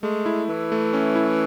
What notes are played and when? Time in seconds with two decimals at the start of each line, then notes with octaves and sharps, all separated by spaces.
0.03 G#3 A3
0.26 E4
0.49 E3 A3
0.72 A3
0.93 C#4
1.16 E4